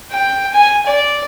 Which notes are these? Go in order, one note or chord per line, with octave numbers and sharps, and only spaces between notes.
G5
G#5
D5